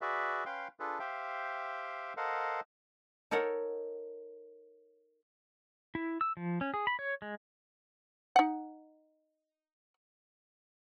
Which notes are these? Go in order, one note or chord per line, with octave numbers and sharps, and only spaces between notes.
F#4 G#4 B4 D5 E5
C#4 B4 F5 G5 C6
D4 F4 G#4 A4 B4
G4 C5 E5 F5 G5
A4 A#4 C5 D#5 F5 F#5
D#4 A4 A#4 C#5 F#5
E4
E6
F3
C#4
G#4
B5
C#5
G#3
D#4 F#5